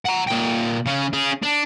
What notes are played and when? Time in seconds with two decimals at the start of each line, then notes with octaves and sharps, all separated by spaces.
0.06 F#5 A#5
0.29 A#2 G5
0.86 C#3 C#4
1.13 C#4 G#4
1.43 D4